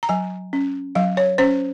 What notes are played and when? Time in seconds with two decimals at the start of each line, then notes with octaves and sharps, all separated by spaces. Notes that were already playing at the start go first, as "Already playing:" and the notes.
0.03 A#5
0.09 F#3 G#5
0.53 C#4
0.95 F#3 F5
1.17 C#5
1.38 C#4 C5